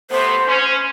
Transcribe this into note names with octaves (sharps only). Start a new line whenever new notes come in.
C3 A3 B3 C5
C#4